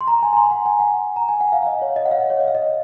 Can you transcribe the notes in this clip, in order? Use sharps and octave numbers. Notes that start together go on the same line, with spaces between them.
C6
A#5
G#5
A#5
C6
F#5
G#5
F#5
A#5
G#5
F#5
F5
F5
D#5
C#5
D#5
F#5
F5
C#5
D#5
F5
D#5